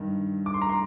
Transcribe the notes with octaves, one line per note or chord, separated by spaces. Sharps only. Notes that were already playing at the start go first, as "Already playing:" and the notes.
Already playing: G2 D#3
D6
C6
A#5
C6